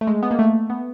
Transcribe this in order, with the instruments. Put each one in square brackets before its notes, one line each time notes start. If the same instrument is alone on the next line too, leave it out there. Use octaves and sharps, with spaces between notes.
[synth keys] A3
G#3
B3
A#3
A3
B3